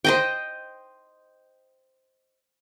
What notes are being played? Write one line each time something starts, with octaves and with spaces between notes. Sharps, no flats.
C5 D#5 G5